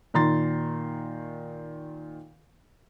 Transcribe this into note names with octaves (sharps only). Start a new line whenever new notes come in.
A#2 D#3 A#5 C6 A6